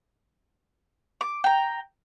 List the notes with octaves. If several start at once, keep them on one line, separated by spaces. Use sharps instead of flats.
D6
G5 A#5